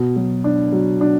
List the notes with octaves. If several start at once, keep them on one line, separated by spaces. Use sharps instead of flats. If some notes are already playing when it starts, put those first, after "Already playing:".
Already playing: B2
F#3
D4
F#3
D4